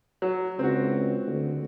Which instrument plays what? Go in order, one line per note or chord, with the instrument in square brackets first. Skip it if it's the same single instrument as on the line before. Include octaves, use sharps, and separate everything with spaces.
[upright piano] F#3
[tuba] C#2 [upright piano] C4 F#4
[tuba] D2